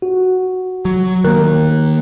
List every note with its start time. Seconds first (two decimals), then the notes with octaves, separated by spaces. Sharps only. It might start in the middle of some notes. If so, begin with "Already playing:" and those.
0.02 F#4
0.85 F#3
1.24 D#3 A#3 A#4 F#6